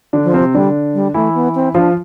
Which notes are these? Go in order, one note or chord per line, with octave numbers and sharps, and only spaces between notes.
D3 D4
F3
C3 C4
D3 G3 D4
G3
E3 A3 E4
B3
C4
F3 D4 F4